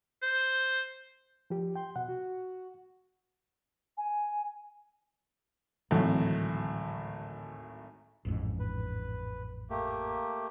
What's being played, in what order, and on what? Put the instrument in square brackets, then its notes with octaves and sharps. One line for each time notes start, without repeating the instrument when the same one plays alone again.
[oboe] C5
[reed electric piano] F3 G4
[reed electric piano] G5 [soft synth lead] C6
[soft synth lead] B2 [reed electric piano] F#5
[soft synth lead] F#4
[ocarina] G#5
[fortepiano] G#1 A2 F#3 [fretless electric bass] D2 E3 C4
[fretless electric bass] A1 F2 G#2
[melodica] B4
A3 A#3 G4